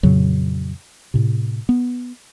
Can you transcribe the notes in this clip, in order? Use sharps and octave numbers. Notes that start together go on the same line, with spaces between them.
F2 A#2 C#3 F#3
A2 C3
B3